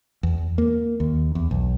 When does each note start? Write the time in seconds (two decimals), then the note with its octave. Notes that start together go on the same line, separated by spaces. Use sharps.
0.23 E2
0.58 A#3
1.00 D#2
1.35 E2
1.51 B1